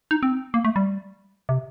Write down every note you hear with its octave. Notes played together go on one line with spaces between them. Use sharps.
D#4
C4
A#3
A3
G3
C3